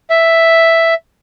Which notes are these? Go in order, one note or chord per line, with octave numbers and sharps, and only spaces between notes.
E5